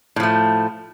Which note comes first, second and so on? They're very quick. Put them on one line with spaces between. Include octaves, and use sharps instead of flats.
A2 F3 A3